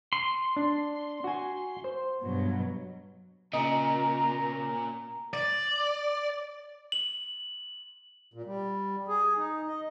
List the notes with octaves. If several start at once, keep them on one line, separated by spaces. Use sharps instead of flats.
C6
D4
F#4 G#5
C5
G2 B2 F#3
A#2 C#3 D#5 A#5
D5
F#7
A#2
G3
G#4
D#4
D#5